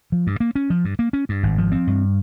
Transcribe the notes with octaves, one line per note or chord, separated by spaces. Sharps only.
F3
G2
A#3
C#4
F3
G2
A#3
C#4
G2
G#1
F3
C4
G2